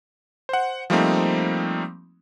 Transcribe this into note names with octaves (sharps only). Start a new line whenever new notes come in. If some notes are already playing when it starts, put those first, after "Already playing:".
C5 F#5
F3 G3 A3 A#3 C4 D#4